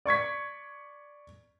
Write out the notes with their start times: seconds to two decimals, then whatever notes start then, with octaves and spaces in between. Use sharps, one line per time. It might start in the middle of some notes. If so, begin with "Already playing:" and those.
0.06 D5 C#6 G#6 B6